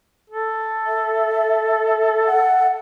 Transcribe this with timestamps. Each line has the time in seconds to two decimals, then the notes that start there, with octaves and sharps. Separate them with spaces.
0.30 A4
0.86 E5
2.27 F#5